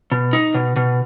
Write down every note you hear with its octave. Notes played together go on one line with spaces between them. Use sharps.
B2
D#4
B2
B2